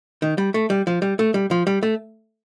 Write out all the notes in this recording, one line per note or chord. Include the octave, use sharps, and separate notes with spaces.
D#3
G3
A3
G3
F3
G3
A3
G3
F3
G3
A3